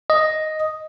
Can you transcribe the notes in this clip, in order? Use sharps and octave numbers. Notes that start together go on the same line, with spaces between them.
D#5